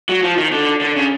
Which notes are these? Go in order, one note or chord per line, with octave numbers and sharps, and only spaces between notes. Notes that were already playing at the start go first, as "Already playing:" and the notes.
F#3
F3
D#3
D3
D3
C#3